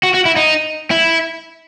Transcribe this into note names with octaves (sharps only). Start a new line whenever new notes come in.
F#4
F#4
E4
D#4
E4